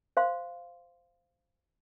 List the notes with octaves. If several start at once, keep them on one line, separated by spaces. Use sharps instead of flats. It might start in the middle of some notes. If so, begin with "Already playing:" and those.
C5 F5 C6